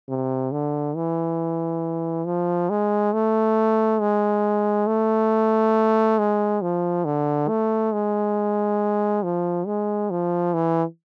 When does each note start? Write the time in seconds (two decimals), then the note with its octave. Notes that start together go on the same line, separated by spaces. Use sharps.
0.09 C3
0.52 D3
0.96 E3
2.26 F3
2.70 G#3
3.13 A3
4.01 G#3
4.87 A3
6.19 G#3
6.62 F3
7.05 D3
7.49 A3
7.93 G#3
9.23 F3
9.67 G#3
10.11 F3
10.54 E3